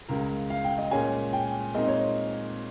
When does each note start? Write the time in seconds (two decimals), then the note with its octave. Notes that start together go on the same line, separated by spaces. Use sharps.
0.09 C#2 C#3 G#3 A#4
0.50 F5
0.64 G5
0.78 D#5
0.91 A#2 G#3 C#4 G#5
1.33 G5
1.75 A#2 G#3 C4 D#4 D#5
1.88 C#5